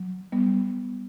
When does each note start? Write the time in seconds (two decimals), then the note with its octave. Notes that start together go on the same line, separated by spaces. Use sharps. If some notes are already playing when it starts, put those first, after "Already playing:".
Already playing: F#3
0.32 G3 B3